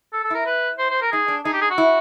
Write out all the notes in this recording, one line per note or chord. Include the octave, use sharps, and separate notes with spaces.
A4
A4
E4 A#4
B4
C5
C5
A#4
D#4 G#4
D4
D#4 G#4
G4
G#4
F#4
E4